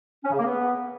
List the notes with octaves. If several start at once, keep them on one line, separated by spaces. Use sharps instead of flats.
C#4
C#3
A#3
B3